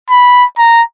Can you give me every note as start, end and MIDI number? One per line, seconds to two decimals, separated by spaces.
0.11 0.45 83
0.58 0.82 82